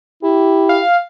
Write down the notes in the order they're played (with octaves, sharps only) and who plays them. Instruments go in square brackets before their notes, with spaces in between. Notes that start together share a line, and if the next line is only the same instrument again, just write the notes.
[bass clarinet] E4 [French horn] G4
[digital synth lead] F5